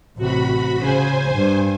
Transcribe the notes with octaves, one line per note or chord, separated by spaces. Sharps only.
A1 C3 F#4 B5
C#3 C5 G#5
G2